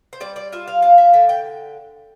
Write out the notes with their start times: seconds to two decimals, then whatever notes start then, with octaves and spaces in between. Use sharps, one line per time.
0.13 C5
0.20 G3 D5
0.36 D5
0.52 F4 E5
0.68 F5
0.82 D4 F5
0.98 E5
1.13 D3 E5
1.29 G5